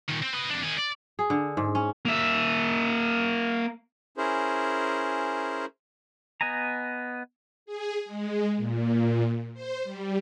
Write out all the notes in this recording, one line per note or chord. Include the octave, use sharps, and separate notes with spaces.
A#2 D#3
C4 C5
B4 D#5
F2 D4
D#3 G#4
D5
G#4
D3
G#2
C#4
A#3 E5
C#4 E4 G#4 A#4 C5
B3 D#5 G#5 A#5
G#4
G#3
A#2
C5
G3